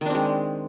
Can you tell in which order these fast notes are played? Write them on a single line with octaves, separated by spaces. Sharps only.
D#3 D4 C4 G#3